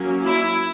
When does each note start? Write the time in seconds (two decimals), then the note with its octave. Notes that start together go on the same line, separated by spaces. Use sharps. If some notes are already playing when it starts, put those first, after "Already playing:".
Already playing: F#3 A#3 C#4
0.23 E4